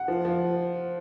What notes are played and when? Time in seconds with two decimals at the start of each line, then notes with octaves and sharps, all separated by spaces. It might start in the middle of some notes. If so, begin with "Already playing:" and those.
Already playing: F#5
0.08 F3
0.25 F3